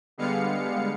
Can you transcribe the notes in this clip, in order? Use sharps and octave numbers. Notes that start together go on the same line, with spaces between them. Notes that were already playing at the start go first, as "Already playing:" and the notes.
D3 G3 G#3 B3 F5 C#7